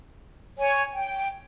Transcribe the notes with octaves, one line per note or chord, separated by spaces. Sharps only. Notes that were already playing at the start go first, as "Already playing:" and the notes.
C#5 G#5
G5